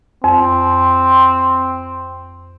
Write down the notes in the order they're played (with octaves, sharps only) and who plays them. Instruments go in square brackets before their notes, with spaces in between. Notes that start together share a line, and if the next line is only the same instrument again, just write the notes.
[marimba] F2 [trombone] C4